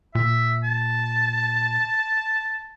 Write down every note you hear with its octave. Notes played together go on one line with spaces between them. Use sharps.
A#2 E5
A5